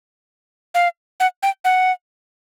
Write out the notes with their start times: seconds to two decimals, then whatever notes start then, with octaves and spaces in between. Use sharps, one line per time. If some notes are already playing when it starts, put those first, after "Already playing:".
0.74 F5
1.20 F#5
1.43 G5
1.65 F#5